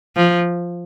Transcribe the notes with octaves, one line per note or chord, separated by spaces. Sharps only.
F3